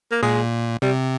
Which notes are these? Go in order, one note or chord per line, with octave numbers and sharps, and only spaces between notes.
A#3
A#2 G#3
C3 G3